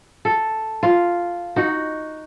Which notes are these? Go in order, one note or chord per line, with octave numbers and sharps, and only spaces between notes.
A4
F4
D#4 F#4